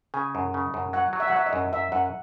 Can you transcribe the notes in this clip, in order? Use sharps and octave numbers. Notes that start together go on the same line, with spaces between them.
C#3 G#5
F#2
C#3
F#2
F#3 F#5
F#3
E5
F#5
F#3 E5
D#5
F#2
F#2 E5
F#2 F#5